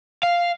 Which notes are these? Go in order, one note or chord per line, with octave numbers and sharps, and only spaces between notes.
F5